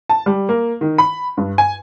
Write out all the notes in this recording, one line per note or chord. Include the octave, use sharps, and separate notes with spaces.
A5
G3
A#3
D#3
B5
G2
G#5